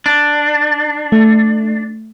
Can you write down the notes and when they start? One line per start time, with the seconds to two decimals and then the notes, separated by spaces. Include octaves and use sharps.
0.06 D4
1.12 A3